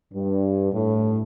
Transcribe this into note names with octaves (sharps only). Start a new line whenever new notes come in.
G2
A2